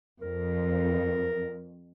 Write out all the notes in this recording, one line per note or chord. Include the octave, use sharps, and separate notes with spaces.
F2 A#4